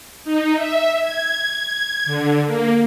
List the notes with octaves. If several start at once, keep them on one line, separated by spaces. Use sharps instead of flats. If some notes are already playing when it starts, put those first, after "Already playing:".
D#4
E5
G#6
D3
A#3